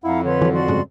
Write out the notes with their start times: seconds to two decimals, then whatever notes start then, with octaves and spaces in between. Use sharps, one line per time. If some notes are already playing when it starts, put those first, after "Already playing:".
0.04 F2 E4 F5 F#5 A#5
0.24 D3 B4 C#5 C6
0.42 E3 F#3
0.54 F#4 D5 C6
0.68 G2 C#3 G#3